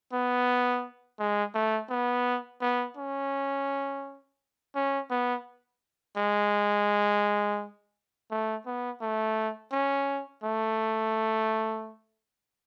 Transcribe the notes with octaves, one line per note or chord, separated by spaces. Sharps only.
B3
G#3
A3
B3
B3
C#4
C#4
B3
G#3
A3
B3
A3
C#4
A3